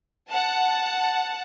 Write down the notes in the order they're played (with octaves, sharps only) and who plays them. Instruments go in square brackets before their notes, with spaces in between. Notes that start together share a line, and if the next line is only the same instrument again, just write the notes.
[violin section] F#5 A5